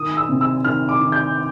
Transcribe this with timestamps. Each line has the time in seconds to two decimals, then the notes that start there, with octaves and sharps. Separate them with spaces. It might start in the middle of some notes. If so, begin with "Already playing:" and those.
Already playing: D#3 D#6
0.17 E6
0.29 C3
0.41 E6
0.65 D#3 F6
0.89 D6
1.00 D#3
1.12 G6